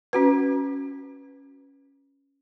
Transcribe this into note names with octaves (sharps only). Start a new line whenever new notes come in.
C#4 F#4 B4